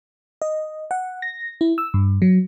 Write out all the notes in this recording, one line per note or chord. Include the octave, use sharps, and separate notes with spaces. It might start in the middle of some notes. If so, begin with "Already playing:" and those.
D#5
F#5
A#6
E4
E6
G2
F#3